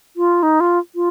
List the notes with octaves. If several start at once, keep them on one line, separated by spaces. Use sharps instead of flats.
F4
D#4
F4
F4